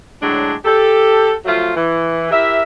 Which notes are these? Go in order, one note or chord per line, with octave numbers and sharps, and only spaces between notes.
A2 D3 F#3 G#3 D4
G4 A4
F3 F#3 A3 F4
E3
E4 G4 A#4 E5